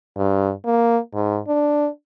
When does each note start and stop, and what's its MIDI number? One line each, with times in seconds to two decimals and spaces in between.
0.16 0.51 43
0.65 0.98 58
1.13 1.39 44
1.48 1.88 62